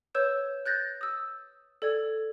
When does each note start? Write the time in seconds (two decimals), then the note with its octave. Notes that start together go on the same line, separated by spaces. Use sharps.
0.15 B4 C#5 E6 G6 E7
0.66 F#6 G6 A6 A#6
1.01 D#6 E6
1.82 A4 D5 G#6